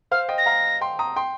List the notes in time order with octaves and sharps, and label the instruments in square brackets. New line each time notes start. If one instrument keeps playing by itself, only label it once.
[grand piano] C5 F5 [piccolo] F6
[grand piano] D#5 G5
[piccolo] A#6
[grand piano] F5 A#5
G5 C6
A#5 D#6
G5 C6